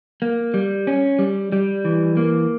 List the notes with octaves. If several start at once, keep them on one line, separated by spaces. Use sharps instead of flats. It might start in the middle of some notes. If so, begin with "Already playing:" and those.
A#3
G3
C#4
G3
G3
E3
A#3